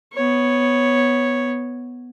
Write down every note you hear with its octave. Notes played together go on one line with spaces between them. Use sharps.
B3 C#5